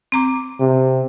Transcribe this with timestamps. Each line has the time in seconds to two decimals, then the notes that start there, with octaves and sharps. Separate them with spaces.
0.12 C4 A#5 D6
0.60 C3